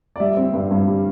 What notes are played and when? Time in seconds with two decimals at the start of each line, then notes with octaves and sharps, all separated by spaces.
0.16 D5
0.20 G3 E5
0.37 C4
0.54 G2
0.71 G2
0.87 G3